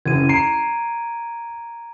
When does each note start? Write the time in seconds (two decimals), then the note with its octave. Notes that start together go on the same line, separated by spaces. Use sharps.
0.06 F#1 F#2 E3 G#6 D#7
0.29 A#5 C7 D7